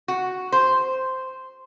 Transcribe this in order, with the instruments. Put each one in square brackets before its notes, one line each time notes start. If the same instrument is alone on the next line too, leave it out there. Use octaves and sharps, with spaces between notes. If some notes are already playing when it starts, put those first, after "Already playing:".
[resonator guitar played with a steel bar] F#4
C5